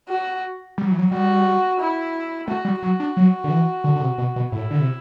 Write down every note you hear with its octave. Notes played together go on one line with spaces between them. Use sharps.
F#4
G3
F#3
E3
F#3
G3 F#4
E4
A3 F#4
G3
F#3 F#4
D4
F#3
D3
E3
D3
D3
C3
B2
B2
A2 E4
D3
C3